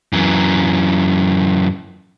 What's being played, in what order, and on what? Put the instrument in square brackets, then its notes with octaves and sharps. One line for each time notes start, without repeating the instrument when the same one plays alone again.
[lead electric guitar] F#2 E3